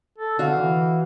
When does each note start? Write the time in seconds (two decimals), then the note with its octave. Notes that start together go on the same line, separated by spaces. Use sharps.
0.18 A4
0.39 D3 F#4 F5
0.54 E3